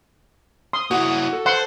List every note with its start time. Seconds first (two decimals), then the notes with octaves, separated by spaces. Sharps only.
0.73 C6 D#6
0.91 A#3 E4 F#4
1.33 A4
1.46 C5 F#5 C6